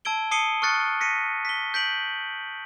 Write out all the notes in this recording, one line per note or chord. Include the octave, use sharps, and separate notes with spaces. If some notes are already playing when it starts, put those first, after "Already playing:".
A5 E6 G#6 D7 G7
A5 D#6 C7 C#7 D#7 G7
C#6 D#6 F6 F#6 A6 C#7
A#6 B6 C#7 D#7
B6 G7
G6 B6 D7 F#7